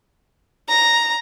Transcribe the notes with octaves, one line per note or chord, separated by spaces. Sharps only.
A#5